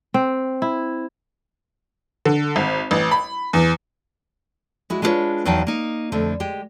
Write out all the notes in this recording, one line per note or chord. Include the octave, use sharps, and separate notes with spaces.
C4
E4
D3
G#1
A1
B5
E2
G#3 E4 F#4
G#3 D4 E4 F4 B4 C#5
E2 F#3 D#4 F5 G5 A5
A#3 D#4
F2 D3 A3
G#3 G4